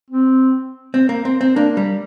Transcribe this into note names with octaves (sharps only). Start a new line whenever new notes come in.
C4
C4
A#3
C4
C4
A#3 D4
G3